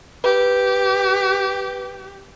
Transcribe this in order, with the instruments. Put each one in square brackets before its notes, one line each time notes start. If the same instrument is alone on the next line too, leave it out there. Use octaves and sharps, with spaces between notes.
[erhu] G4 [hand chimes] B4